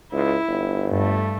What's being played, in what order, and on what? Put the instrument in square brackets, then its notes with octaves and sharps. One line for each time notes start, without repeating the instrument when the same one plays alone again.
[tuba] C#2 [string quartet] E4
[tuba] G1
[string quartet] G2 A3